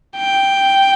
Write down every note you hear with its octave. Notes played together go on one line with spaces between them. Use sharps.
G5